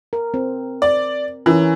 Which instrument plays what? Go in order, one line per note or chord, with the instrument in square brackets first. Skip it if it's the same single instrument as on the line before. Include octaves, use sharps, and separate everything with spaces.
[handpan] A#4
C4
[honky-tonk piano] D5
[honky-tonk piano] E3 [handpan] C#4 A#4